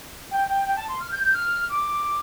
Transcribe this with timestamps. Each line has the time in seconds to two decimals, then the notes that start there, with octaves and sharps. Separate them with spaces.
0.31 G5
0.48 G5
0.65 G5
0.76 A5
0.88 C6
1.00 F6
1.11 G6
1.23 G6
1.34 F6
1.70 D6